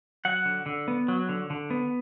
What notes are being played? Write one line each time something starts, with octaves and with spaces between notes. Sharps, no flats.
F#3 F#5
D3
D3
B3
F#3
D3
D3
B3